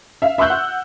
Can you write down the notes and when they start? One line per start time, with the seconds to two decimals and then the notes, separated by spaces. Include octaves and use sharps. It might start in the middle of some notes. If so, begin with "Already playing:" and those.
0.22 E5 F5
0.38 E5 C6 C#6 E6 F#6 G6
0.50 F#5